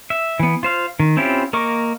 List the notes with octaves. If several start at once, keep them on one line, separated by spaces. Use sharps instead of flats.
E5
E3 B3
F4 C5 F5
D#3
C4 C#4 E4 F4 G4
A#3 A#4 D#5 C#6 D6